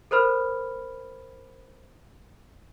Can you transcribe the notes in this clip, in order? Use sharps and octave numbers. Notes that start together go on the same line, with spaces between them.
A4 A#4 C5 B5 F6